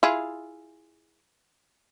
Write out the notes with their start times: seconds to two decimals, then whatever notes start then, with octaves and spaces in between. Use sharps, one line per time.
0.03 E4 F4 G#4